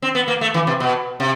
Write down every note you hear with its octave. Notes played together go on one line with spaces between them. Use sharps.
C4
B3
A#3
A3
E3
C3
B2
C3